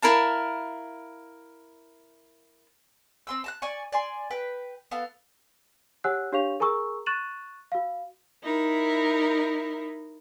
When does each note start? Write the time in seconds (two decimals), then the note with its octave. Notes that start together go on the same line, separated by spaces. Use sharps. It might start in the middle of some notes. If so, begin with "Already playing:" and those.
0.02 E4 A#4 F5 A5
3.27 C4 C6 E6
3.44 A5 A#5 F#6
3.62 D5 G#5 C#6
3.92 D5 G#5 C6
4.31 B4 G5
4.91 B3 A4 F5
6.04 G4 C#5 F#5 G#5 E6 F#6
6.32 D4 G4 C#5 F5 C#6 F7
6.60 G#4 A#4 G#5 A#5 C#6 E6
7.06 C#6 F#6 A6 D#7 E7 F#7
7.72 F#4 F5
8.44 D#4 E4 A#4